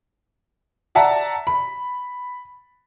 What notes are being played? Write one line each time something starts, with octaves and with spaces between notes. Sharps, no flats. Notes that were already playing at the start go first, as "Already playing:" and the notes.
D5 E5 F#5 A5 A#5
B5